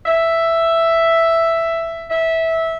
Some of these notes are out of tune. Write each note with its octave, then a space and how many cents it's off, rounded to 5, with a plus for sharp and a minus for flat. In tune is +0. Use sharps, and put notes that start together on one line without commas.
E5 +5
E5 -15